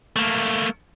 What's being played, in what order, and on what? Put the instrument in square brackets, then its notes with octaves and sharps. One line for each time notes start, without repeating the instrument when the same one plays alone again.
[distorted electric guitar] A3 A#3